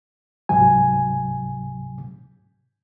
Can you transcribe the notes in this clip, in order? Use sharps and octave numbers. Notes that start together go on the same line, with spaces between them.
C#2 G#2 C3 F#3 G#5